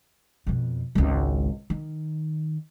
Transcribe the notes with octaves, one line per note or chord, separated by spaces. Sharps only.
F2 B2
G#1 C#2
D#3